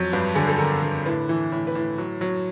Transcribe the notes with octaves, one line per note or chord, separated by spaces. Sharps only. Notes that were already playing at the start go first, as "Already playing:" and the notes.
Already playing: F2 F#3
G2 B4
D3 G#4
A4
D3 A#4
D3
A2 B4
E3
A2
B4
A2
F#3
F#3